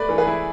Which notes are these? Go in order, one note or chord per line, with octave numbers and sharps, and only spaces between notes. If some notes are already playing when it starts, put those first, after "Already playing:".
Already playing: A3 B4 D5
E3
G#4 B4
E4